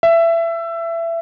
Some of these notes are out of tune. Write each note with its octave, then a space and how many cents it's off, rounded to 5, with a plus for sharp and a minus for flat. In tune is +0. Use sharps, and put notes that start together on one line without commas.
E5 +20